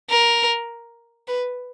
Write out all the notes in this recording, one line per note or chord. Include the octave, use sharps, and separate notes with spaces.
A#4
B4